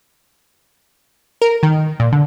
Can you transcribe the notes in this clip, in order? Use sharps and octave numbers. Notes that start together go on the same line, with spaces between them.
A#4
D#3
A#2
D3